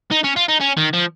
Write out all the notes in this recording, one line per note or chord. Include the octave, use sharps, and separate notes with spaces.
D#4
C#4
F4
D#4
C#4
D#3
F3